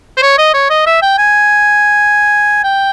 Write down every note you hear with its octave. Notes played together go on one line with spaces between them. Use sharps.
C5
C#5
D#5
C#5
D#5
E5
G5
G#5
G5